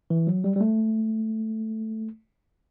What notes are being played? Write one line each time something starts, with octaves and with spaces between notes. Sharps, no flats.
E3
F#3
G3
G3
A3